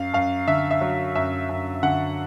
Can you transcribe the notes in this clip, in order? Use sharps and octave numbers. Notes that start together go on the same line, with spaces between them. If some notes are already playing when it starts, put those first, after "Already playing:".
Already playing: F#2 F5
F#2 F5
D3 E5
E5
F#3
F#2 E5
F#2
D3 F#5